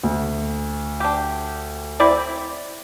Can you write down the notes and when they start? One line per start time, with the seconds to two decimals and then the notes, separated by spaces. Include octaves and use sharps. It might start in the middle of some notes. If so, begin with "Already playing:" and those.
0.03 D2
1.00 D4 G4
2.00 C4 E4 D5